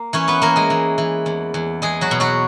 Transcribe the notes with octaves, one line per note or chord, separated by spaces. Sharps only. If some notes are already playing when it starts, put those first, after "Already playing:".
Already playing: A#3
E3 C#4 C#5
B3 B4
E3 A#3 A#4
G#3 G#4
E3
E3
E2
E2
E2 G#3 G#4
F#3 F#4
B2
F#3 F#4